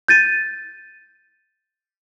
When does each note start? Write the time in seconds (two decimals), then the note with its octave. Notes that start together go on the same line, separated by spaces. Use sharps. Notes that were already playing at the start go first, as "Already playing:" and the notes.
0.08 G6 A6 D#7